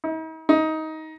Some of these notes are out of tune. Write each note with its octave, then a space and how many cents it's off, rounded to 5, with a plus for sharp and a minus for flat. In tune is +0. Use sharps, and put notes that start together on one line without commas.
D#4 +45
D#4 +20